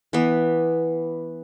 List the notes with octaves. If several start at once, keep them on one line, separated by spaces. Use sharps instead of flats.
E3 B3